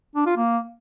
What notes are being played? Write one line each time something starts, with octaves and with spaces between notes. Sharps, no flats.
D4
F4
A#3